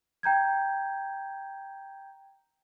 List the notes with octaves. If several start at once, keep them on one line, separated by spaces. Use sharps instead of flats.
G5 A#5 G6 G#6